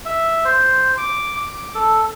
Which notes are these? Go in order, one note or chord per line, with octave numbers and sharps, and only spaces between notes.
E5
C5
D6
D6
A4